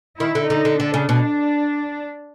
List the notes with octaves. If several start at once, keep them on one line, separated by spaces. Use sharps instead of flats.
D#3 E4
D3
D3 D#4
D3
D3 D4
C#3
B2